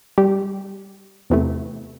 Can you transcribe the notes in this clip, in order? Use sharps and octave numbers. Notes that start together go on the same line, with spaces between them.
G3 G4
E2 C3 E3 A3